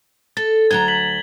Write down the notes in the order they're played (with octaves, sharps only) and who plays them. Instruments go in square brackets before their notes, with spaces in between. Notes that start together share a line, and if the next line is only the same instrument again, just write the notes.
[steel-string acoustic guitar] A4 [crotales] A6
[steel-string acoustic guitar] D2 F#3 A#5 [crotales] G#6 G7
[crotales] B6 F#7